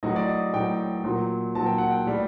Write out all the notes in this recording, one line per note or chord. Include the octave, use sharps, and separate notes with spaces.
A2 F#3 D#5
D5
D#5
A2 F#3 G5
A#2 F#3
A#2 F#3 A5
G5
F#5
G5
A2 G3